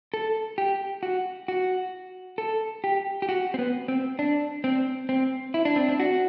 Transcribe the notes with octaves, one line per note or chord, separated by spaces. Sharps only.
A4
G4
F#4
F#4
A4
G4
G4
F#4
C4
B3
C4
D4
C4
C4
E4
D4
C4
D4
F#4